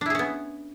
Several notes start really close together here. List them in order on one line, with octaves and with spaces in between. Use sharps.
D4 E4 G#4 C#4 B3